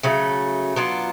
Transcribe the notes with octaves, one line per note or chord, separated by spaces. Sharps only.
C#3 F#3 A3
F#3 B3 D4 F4